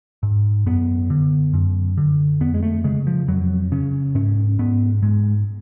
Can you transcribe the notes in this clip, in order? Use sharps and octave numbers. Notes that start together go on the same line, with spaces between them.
G#2
F#2 B3
D3
F#2
D3
F2 B3
G#3
A3
C#3 G#3
F3
F2 F#3
C#3 C#4
G#2 C#4
G#2 B3
G#2 G#3